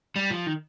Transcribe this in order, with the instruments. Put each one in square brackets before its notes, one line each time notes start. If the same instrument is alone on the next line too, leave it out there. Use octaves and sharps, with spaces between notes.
[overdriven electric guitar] G3
F3
D#3